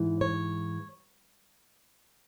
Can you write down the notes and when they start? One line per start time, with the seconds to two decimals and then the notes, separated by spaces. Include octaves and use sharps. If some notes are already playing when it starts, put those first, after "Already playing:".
Already playing: G#2 E3
0.21 C#5